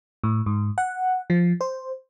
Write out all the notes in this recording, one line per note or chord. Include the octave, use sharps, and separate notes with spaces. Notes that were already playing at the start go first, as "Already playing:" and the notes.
A2
G#2
F#5
F3
C5